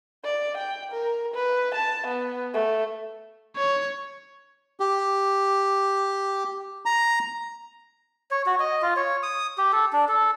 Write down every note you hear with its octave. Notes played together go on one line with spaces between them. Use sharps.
D5
G5
A#4
B4
A5
B3
A3
C#5
G4
A#5
C#5
F#4
D#5
F4
C#5
D#6
G4
A4
D4
A4